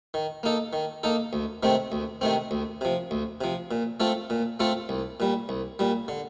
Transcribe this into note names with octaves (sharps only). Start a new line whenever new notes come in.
D#3
A#3 D#4 A4
D#3
A#3 D#4 A4
D2
C3 D#3 A3 C4
D2
C3 D#3 A3 C4
D2
C3 F3
D2
C3 F3
A#2
A3 C4 F4 A4
A#2
A3 C4 F4 A4
C2
A#2 G3
C2
A#2 G3
D3